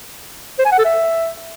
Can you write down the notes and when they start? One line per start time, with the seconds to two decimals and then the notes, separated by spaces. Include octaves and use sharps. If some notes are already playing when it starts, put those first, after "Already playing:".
0.59 C5
0.65 G#5
0.72 F#5
0.78 A4
0.85 E5